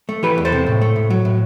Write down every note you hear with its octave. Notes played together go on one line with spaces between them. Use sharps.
A3
E3 G4 B4
E2
A4 C5
C3
A2
A3
A2
F#3
A2